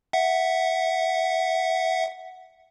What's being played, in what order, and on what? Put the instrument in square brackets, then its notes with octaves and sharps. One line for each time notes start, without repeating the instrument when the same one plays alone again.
[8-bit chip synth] E5 F#5